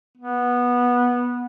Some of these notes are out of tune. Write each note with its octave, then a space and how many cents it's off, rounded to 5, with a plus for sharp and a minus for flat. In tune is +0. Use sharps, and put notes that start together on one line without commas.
B3 -15